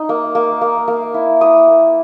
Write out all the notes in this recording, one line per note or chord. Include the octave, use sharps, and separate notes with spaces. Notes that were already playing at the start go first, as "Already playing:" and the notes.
Already playing: D#4
A#3
A#3
A#3
A#3
E4
E4 D#6
A#3